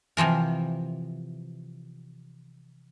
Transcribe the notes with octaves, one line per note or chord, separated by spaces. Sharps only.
C3 E3 F3 A#4